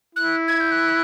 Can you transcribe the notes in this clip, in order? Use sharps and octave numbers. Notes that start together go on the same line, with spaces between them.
E4 F#6
G#6
G6
F#6